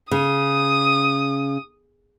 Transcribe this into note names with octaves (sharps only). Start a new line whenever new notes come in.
C#3 D#6